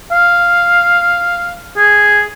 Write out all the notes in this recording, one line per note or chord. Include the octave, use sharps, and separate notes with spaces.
F5
G#4